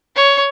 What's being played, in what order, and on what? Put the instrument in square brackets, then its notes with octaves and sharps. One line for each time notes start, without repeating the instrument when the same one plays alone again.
[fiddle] C#5